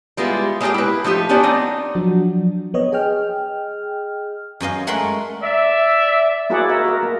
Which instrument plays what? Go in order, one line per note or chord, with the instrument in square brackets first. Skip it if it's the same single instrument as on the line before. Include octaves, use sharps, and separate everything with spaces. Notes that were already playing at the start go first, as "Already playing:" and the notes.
[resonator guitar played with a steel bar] G3 G#3 B3 E4 F4
G#3 A#3 D4 G4 G#4 G5
E4 B4
F3 A3 D#4 G4
B3 C#4 D4 C5 D5
C4 D#4
[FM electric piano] F3 F#3 D4 F#4
B3 C#5 D#5
G#4 D#5 G5 F6
[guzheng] F#2 C#4 D#5 F5
G#3 A3 A#4 F#5 C6
[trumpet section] D5 E5
[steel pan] A#3 E4 F#4 G#4 D5 F#5
F#4 A#4 D#5 E5
F#4 A#4
A#3